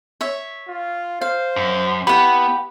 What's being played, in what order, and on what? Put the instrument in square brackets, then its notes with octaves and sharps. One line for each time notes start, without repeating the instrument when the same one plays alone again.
[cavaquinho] C#5 E5
[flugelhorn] F4
[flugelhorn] C5 [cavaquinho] F5
[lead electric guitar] F#2
[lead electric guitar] B3 [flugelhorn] E4 [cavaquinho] G4 F#5 [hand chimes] B5